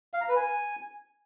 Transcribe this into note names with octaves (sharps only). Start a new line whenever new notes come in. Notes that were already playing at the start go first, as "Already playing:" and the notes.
F5
A#5
B4
G#5